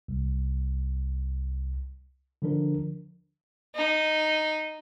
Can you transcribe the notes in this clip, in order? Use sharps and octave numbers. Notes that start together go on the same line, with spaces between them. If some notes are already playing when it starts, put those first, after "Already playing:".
C2
D3 F3 D4 A#4
D#4